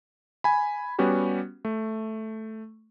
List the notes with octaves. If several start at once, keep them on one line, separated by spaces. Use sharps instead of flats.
G#5 B5
G3 B3 C#4 F#4 G4
A3